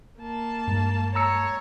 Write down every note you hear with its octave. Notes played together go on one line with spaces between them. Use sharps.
A#3 A5
G2 G#3
C#5 A#5 E6 C#7